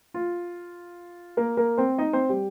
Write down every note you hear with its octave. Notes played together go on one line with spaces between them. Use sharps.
F4
A#3 A#4
A#3 A#4
C4 C5
D#4 D#5
C4 C5
G3 G4